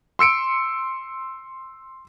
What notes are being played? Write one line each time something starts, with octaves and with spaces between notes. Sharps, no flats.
C6 E6 C#7 D7